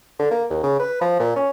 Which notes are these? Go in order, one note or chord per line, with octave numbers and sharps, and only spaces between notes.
D3
A#3
D#2
C#3
B4
F3
A#2
C#4